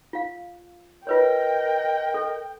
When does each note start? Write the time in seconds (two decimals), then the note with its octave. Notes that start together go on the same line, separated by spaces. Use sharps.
0.13 F4 F5
1.07 F4 A#4 B4 C#5 D#5 G5
2.14 A4